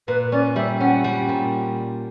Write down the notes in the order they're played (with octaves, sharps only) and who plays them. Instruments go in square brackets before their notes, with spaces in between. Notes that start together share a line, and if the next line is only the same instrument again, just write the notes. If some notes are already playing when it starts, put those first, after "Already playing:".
[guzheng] A#2 [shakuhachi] B4
[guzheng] C#4 [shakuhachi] D5
[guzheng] G3 [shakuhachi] E5
[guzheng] C#4 [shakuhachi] F#5
[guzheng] G3
A#2